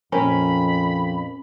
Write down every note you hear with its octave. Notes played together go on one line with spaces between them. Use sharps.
F2 A#2 C4 C#4 A#4 B5